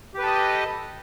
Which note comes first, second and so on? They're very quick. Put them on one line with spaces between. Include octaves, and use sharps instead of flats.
G4 B4 A4 D#5